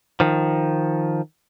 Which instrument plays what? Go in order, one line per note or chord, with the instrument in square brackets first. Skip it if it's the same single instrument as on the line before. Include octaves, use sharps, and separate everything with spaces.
[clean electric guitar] D#3 F3